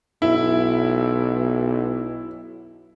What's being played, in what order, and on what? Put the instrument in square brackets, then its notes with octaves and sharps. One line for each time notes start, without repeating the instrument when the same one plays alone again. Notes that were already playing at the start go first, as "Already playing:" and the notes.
[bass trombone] B1 [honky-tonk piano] E4